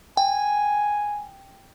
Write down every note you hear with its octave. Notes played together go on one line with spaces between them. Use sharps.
G5 G#5